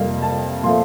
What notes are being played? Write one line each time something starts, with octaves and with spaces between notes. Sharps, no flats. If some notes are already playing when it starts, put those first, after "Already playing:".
Already playing: F2 C3 G3 A#3 F5
A5
A#2 F3 A3 C6